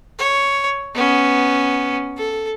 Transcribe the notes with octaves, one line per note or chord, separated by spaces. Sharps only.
C#5
B3 C#4
A4